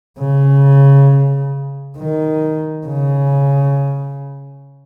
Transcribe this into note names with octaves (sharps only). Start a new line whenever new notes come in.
C#3
D#3
C#3